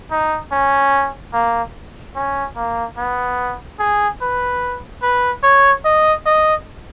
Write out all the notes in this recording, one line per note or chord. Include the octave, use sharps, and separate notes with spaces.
D#4
C#4
A#3
C#4
A#3
B3
G#4
B4
B4
C#5
D#5
D#5